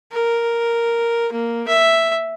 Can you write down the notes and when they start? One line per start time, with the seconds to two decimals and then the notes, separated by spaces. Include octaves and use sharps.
0.12 A#4
1.32 A#3
1.68 E5